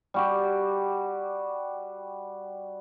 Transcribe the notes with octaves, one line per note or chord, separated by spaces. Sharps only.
G3 F#4 G4